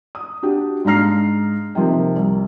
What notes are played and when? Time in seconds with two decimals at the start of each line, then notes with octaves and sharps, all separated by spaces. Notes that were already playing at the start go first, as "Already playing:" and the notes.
0.15 D#6
0.43 D4 F#4 G4
0.85 G#2 D4 F5 A#5 F6 C7
1.75 C3 D#3 F3 A#3
2.16 C2